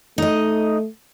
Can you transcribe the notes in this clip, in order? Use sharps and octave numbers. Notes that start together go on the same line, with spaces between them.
A3 D#4 D#5